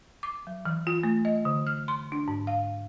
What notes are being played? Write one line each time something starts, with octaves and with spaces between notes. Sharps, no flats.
D6
F#3
E3
F4
A3
D#5
D3
F6
C6
D4
G#2
F5